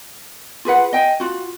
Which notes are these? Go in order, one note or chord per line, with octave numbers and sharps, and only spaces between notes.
F4 G#4 B4 F#5
D#5 G5 G#5
F4 F#4